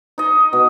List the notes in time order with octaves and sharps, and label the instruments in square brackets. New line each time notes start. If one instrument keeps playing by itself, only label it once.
[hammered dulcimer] D#4 D#5
B2